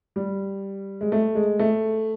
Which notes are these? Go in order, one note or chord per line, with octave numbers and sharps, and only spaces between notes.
G3
G#3
A3
G#3
A3